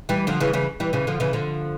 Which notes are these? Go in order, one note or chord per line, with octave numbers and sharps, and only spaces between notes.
E3 G3
D3 F3
C#3 E3
C#3 E3
E3 G3
C#3 E3
D3 F3
C#3 E3
D3 F3